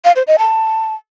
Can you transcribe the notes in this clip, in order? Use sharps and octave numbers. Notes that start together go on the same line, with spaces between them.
F5
C5
D#5
A5